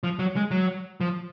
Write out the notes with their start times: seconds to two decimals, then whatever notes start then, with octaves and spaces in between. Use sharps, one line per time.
0.03 F3
0.19 F#3
0.36 G#3
0.51 F#3
1.00 F3